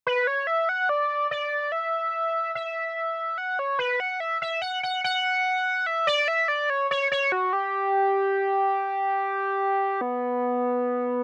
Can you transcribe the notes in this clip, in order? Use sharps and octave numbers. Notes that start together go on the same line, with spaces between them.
B4
C#5
E5
F#5
D5
D5
E5
E5
F#5
C#5
B4
F#5
E5
E5
F#5
F#5
F#5
E5
D5
E5
D5
C#5
C#5
C#5
F#4
G4
B3